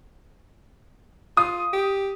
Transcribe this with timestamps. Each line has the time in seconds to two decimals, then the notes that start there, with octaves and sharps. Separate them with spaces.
1.37 F4 D#6
1.73 G4